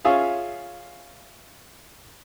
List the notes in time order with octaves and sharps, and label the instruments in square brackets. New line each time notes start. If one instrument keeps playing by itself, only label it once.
[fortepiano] C#4 F4 G#4 E5 F5